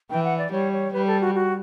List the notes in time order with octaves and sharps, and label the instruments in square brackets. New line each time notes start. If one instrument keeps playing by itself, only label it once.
[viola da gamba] E3 [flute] G5
[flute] F#5
D5
[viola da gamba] G3 [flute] C#5
[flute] C#5
[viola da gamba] G3 [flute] B4
[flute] A4
F#4
F#4